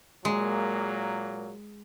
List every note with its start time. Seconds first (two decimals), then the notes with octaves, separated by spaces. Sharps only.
0.25 A#2 F#3 G#3 A#3